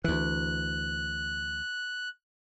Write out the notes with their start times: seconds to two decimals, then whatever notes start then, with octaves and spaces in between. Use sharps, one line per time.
0.04 D2 E3 F#6